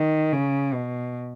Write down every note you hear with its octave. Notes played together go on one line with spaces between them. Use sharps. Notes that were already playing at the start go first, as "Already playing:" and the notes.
Already playing: D#3
C#3
B2